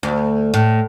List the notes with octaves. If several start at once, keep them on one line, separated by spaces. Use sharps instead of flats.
D2
A2